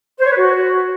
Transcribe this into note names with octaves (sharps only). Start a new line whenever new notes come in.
C5
C#5
B4
F#4